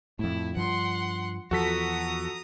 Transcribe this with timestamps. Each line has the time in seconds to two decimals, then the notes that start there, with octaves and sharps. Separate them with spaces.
0.19 F2 A2 E4
0.56 G2 F3 F#5 C6
1.51 E2 F3 F#4 A4 A#5 D#6 B6